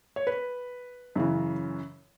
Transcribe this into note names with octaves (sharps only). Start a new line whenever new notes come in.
C#5
B4
F#2 C#3 E3